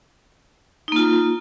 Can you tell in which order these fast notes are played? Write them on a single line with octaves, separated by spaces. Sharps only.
D#4 A#3 F4